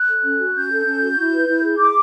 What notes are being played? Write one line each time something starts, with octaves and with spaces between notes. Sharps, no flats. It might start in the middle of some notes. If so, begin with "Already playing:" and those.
Already playing: F#6
A4
C#4
F#4
C#4 G6
A4
C#4
F#4
E4
B4
E4
G#4
E4 D6